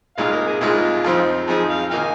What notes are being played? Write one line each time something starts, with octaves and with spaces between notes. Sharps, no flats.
C2 A#2 G#3 D#4 F5
A#4
G#4
C2 A#2 G#3 D#4 F4
F2 F3 C4 D#4
F2 F3 C4 D#4 G#4
F5
D#3 A#3 D#4 F5 G#5